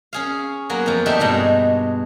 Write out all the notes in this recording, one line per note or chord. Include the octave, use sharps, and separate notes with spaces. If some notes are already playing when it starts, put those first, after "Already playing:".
C#4 G#4 F5
F#3 A#3 B3
F2 F3
A3 D4 D#4 G4 E5
G2 B2 G#3 D#4